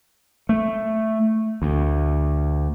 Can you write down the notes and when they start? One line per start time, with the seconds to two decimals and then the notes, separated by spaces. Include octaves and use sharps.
0.49 A3
1.62 D2